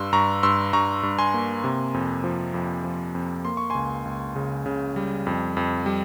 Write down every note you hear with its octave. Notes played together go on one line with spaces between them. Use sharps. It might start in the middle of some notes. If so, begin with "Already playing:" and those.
Already playing: G2 C6 E6
G2 A#5 C#6
G2 C6 E6
G2 A#5 C#6
G2
G#5 C6
A#3
C3
F2
F3
F2
F3
F2
A#3 C6
C#6
C#2 G#5 C6
C#2
C#3
C#3
G3
F2
F2
G3